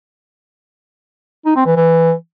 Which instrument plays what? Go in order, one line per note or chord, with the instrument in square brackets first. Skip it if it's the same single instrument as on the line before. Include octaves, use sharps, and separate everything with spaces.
[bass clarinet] D#4
C4
E3
E3